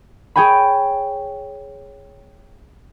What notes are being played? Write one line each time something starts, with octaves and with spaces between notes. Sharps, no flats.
G#4 C#5 G5 G#5 B5